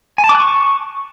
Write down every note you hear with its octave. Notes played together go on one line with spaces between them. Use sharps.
G#5
A5
D6
F#6
C#6